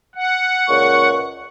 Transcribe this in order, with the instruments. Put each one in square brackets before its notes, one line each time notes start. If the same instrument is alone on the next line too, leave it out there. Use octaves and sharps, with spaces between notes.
[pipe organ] F#5
[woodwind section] C#2 A#2 C#6